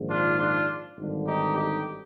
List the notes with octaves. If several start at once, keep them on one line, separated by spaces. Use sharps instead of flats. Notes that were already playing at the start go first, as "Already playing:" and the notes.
Already playing: A#1 G#2 D#3
D4 F4
D4 F4
G#1 G2 D3
D#4 G4
D#4 G4